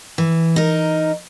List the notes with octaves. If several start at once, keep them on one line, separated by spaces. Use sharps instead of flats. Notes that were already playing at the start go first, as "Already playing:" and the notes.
E3
D#4 A#4